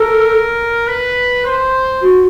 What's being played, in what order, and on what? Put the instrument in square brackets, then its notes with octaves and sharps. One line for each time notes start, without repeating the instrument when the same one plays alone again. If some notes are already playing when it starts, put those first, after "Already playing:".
Already playing: [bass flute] A4 [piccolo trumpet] A#4
[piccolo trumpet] B4
C5
[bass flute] F#4